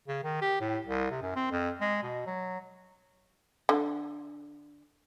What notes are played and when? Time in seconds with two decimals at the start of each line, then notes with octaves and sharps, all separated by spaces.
0.08 C#3
0.23 D#3
0.41 G4
0.61 A2
0.87 C2
1.10 C3
1.22 F#2
1.35 C4
1.51 F2
1.81 G#3
2.03 B2
2.26 F#3
3.69 D3